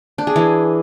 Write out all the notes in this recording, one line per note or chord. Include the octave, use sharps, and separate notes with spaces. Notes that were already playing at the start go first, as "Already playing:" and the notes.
D4
G#4
E3